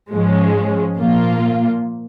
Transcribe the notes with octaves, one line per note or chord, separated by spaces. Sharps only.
G#2 F3 G#3 C#4
A#2 F3 A#3 F4